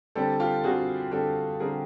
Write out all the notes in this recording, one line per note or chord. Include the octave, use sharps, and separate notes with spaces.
D3 G3 C4 G4 A4
F4 G4
D3 G3 C4 F#4 G#4
D3 G3 C4 G4 A4
D3 G3 C4 G#4 A#4